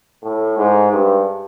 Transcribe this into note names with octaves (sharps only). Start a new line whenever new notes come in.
A2
G#2
G2